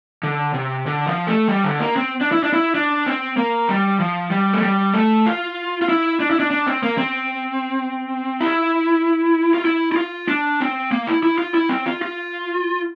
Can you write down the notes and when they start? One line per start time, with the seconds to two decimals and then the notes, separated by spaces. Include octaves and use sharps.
0.23 D3
0.54 C3
0.86 D3
1.06 F3
1.27 A3
1.48 G3
1.64 D3
1.80 A#3
1.96 C4
2.21 D4
2.32 E4
2.44 D4
2.53 E4
2.75 D4
3.06 C4
3.37 A#3
3.69 G3
4.00 F3
4.31 G3
4.53 A3
4.63 G3
4.94 A3
5.26 F4
5.82 F4
5.89 E4
6.20 D4
6.31 E4
6.40 D4
6.51 D4
6.67 C4
6.83 A#3
6.98 C4
8.41 E4
9.54 F4
9.65 E4
9.92 E4
9.97 F4
10.28 D4
10.61 C4
10.92 A#3
11.07 E4
11.23 E4
11.38 F4
11.54 E4
11.69 C4
11.86 F4
12.02 F4